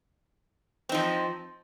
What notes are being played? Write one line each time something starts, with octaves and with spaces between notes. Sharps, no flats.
F3 C4 D#4